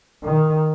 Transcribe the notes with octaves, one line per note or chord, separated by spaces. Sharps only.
D#3